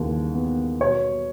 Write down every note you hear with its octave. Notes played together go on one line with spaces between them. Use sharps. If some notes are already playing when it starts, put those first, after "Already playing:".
Already playing: D#2 C#3 E3
B3
B2 C#5